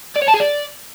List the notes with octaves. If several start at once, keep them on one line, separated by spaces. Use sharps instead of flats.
D5
C#5
A5
G#4
D5